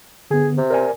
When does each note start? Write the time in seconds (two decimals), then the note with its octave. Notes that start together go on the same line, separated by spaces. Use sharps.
0.31 D3 B3 G#4
0.57 C3
0.70 A#4 D5 G#5